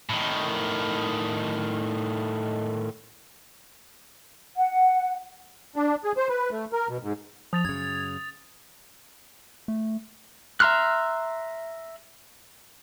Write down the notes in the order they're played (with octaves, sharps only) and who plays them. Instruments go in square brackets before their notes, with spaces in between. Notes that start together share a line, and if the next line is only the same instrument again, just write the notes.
[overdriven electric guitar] A2 D#3
[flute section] F#5
[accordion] D4
G#4
C5
B4
A3
A#4
B2
G#2
[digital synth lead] F3 [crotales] D#6 A6 F7
[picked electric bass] F#2 C#3 [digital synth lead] G#6
[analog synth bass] A3
[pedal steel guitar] E5 A#5 C6 F6 F#6